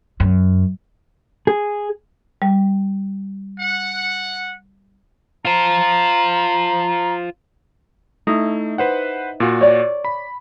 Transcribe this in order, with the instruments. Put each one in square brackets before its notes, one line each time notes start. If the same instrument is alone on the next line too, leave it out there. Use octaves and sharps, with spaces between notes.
[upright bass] F#2
[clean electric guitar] G#4
[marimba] G3
[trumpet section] F#5
[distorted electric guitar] F4 C5 [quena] A#5
[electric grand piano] A3 [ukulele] D#4 E4
[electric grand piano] B4 C5 F#5
A#2 F4 F#4
[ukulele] C#5 D5
[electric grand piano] B5